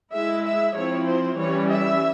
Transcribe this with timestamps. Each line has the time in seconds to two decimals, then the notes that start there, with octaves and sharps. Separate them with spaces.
0.13 G#3 E4 E5
0.44 E5
0.75 F3 C4 E4 C#5
1.07 C5
1.38 E3 G3 C#4 C#5
1.70 E5